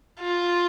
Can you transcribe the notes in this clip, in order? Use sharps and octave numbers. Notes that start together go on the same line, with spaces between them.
F4